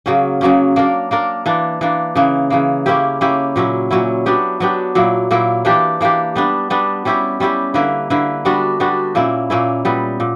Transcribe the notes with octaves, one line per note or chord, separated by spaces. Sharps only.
C#3 F#3 A#3 C#4
C#3 F#3 A#3 C#4
A#3 D4 A#4
A#3 D4 A#4
E3 A#3 D4
E3 A#3 D4
C#3 E3 A#3
C#3 E3 A#3
A#3 C#4 E4 G4
A#3 C#4 E4 G4
A#2 F#3 C#4 E4
A#2 F#3 C#4 E4
F#3 B3 D4 G4
F#3 B3 D4 G4
A#2 F#3 A#3 E4
A#2 F#3 A#3 E4
E3 A#3 D4 G4
E3 A#3 D4 G4
G3 B3 D4
G3 B3 D4
G3 C#4 E4 G4
G3 C#4 E4 G4
D3 A#3 E4 B4
D3 A#3 E4 B4
G3 B3 D4 F#4
G3 B3 D4 F#4
A#2 A#3 C#4 E4
A#2 A#3 C#4 E4
A#2 G3 B3
A#2